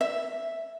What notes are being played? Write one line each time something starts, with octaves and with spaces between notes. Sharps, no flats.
E5